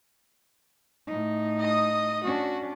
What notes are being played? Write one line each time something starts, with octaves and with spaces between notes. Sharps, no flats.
A2 D#4
D#5 D#6
C#4 D4 F#4